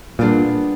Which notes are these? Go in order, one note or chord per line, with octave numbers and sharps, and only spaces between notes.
A#2 G3 B3 D4 F4 G#4